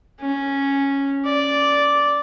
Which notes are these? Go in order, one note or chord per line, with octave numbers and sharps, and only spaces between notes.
C#4
D5